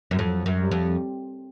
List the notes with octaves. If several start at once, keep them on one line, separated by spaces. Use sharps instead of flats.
F#2
F2 F#3
F#2
G3
F2